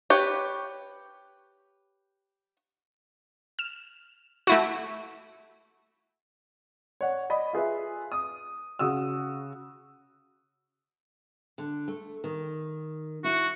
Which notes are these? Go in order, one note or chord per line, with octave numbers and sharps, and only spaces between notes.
G4 B4 C#5
F6 E7
A3 E4 F#4
C#5 D5 F#5
D5 D#5 B5
F4 G#4 B4 E5
D#6
C#3 F#4 D#6 E6
D3
A3
D#3
E4 F#4